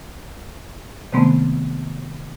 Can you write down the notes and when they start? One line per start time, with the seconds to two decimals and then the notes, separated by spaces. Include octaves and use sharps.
1.12 C3 D#3 G#3 A3 B3 C4